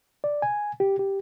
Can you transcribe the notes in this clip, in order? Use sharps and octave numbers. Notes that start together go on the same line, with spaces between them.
D5
G#5
G4
G4